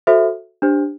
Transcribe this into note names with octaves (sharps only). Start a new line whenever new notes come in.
F#4 A4 C5 E5
D4 G4 C5